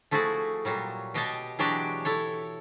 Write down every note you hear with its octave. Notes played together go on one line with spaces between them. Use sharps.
F3 A3 E4 F#4 G#4 A4
A#2 F#3 G3
B2 G4 D#5 F#5 G#5 A5
E3 F#3 G#3 D4 F#4 G4
E4 A4 C#5